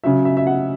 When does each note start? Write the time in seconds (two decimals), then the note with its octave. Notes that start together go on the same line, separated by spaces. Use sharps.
0.04 C#3 F#3 E5
0.25 E5
0.37 E5
0.47 F#5